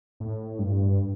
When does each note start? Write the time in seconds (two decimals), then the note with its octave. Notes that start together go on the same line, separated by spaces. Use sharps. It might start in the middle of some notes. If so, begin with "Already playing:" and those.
0.20 A2
0.59 G2